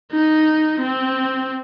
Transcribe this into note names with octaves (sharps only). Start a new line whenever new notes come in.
D#4
C4